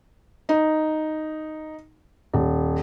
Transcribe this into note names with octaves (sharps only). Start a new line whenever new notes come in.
D#4
D#1